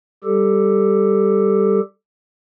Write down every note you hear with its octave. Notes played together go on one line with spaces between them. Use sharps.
G3 G4 A4